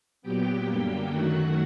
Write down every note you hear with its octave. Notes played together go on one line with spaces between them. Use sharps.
A#2 F#3 B3 G4 G5
F#2 D3 G3 A#3
F#2 D#3 F#3 A3 F#4 F#5